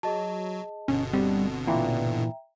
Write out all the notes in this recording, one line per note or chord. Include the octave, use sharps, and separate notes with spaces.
F#3 G#4 D#5 A5
G1 B2 D3 C#4
G3 C4
A#2 E3 E5 G5 A#5